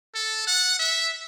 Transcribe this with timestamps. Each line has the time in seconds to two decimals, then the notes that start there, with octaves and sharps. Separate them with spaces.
0.15 A4
0.47 F#5
0.79 E5